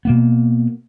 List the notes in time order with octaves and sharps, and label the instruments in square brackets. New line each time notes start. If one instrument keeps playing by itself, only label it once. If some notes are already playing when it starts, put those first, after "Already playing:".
[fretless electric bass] B2 A#3 B3